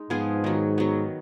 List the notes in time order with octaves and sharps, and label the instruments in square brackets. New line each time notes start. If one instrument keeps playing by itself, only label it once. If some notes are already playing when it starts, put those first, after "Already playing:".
Already playing: [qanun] G#3 D#4
[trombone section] G#2 [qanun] F3 B3 F4 G#4
[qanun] D#3 F#3 B3
D#3 F#3 B3